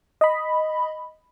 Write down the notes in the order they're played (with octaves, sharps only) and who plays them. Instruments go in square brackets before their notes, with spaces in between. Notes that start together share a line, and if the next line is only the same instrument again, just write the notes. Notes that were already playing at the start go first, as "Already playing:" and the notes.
[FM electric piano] D#5 B5